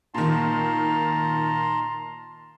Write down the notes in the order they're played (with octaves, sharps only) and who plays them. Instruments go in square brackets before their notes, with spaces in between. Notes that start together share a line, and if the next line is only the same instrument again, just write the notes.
[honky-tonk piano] A#2 D#3 [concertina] A5 A#5 C6